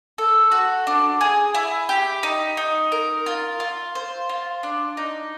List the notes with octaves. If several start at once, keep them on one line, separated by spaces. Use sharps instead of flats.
A4
F#4
D4
G#4
E4
G4
D#4
D#4
A#4
F4
F4
C5
F4
D4
D#4